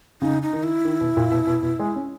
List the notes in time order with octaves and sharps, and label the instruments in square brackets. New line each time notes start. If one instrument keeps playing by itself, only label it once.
[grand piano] C#3 [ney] D#4
[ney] D#4
[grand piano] D#3
[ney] E4
[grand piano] D#3
B2
A#2
B2
B2
B2
G#3
C#4